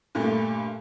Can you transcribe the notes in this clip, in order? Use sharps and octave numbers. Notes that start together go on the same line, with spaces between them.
G2 A#2 A3